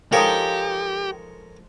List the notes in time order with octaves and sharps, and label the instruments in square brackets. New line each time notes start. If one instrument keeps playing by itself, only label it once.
[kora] F3 G#3 D#4 [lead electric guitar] G4 [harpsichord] A4 A#4 C#5